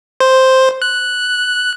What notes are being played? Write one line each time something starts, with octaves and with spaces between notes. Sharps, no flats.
C5
F#6